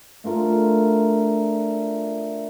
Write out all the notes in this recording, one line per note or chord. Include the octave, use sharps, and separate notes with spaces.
A3 D4 F4 A#4